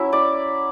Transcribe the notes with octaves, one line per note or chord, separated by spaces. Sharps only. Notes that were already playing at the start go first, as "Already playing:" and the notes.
Already playing: F#3 C#4 E4 E5
D5